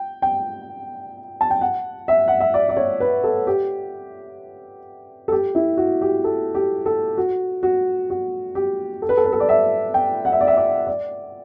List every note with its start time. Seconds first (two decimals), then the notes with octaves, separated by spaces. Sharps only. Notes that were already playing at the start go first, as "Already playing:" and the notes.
Already playing: G5
0.22 G5
1.41 A5
1.51 G5
1.61 F#5
2.08 E5
2.28 F#5
2.40 E5
2.54 D5
2.69 D5
2.77 C#5
3.00 B4
3.24 A4
3.47 G4
5.28 A4
5.32 G4
5.55 E4
5.77 F#4
6.01 G4
6.24 A4
6.55 G4
6.86 A4
7.17 F#4
7.63 F#4
8.10 F#4
8.55 G4
9.02 A4
9.09 B4
9.17 A4
9.25 B4
9.32 A4
9.40 D5
9.49 E5
9.94 G5
10.25 F#5
10.32 E5
10.41 D5
10.47 E5
10.57 D5
10.87 D5